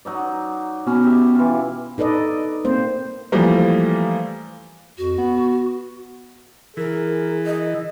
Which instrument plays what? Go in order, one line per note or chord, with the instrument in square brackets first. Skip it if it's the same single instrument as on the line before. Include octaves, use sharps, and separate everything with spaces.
[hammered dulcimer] F#3 D#4 D5
[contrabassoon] B2 [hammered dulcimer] C#4
[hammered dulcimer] G4 E5
E3 F4
[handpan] D#4 A4 B4 D5 D#5
A#3 C4 C5
[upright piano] E3 F3 G3 A3 A#3
[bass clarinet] F2 [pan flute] F#4
[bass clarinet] B3
[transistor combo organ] E3 [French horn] G#4 [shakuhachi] A#4
[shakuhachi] D#5